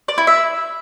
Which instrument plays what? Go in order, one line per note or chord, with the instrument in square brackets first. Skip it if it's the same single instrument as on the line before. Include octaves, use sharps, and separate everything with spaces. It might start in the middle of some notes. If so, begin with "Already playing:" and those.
[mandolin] D5
E4
E5